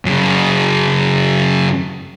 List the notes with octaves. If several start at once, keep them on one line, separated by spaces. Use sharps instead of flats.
F#2 C#3